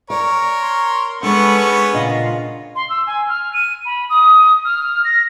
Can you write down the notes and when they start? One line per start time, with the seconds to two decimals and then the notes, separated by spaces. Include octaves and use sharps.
0.10 A#4 C#5 D5
0.62 C6
1.23 G#3 B3 C#4 D4 A4 B4 C#6
1.94 A#2 C#3 D4 F4 D#5
2.76 C6
2.89 E6
3.07 G#5
3.29 F6
3.53 D#7
3.86 B5
4.10 D#6
4.65 F6
5.04 A#6